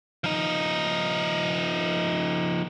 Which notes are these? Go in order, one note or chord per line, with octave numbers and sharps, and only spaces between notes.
F3 D#4